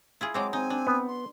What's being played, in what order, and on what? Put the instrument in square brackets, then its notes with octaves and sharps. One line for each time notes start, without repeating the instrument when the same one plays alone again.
[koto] E4 F4 G#4
[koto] F#3 G#3 C4 [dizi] D6
[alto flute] C4 [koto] D#4 [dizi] G#5
[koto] D4
[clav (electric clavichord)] B3
[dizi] C6